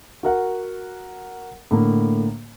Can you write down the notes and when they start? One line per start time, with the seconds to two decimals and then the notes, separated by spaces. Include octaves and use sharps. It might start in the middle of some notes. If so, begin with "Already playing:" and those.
0.23 F#4 A#4 F#5
1.71 A2 D3 A#3